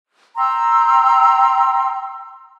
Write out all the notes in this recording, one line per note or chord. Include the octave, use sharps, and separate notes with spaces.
G5 A#5 C6 E6